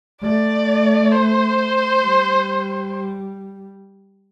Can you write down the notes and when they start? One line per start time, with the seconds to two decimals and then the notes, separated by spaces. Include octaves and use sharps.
0.22 A3 D5
1.12 C5
2.03 G3